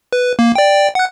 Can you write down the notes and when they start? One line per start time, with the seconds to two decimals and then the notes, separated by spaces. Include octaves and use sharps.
0.13 B4
0.39 A#3
0.55 D5 G5
0.95 F#5 F#6